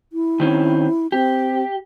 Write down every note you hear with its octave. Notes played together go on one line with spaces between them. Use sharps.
E4
D#3 C4 C#4
C4 G4